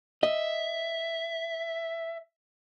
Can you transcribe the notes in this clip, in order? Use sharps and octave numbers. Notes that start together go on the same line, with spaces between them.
D#5 E5